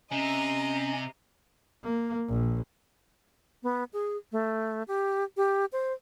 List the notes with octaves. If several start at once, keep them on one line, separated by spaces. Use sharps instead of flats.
C3 C#4 D#5 A#5
A#3
A#1
B3
G#4
A3
G4
G4
C5